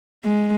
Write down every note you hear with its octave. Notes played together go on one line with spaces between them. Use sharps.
G#3